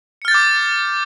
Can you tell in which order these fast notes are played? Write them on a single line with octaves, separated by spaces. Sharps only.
C#7 F6 A6 G6 D6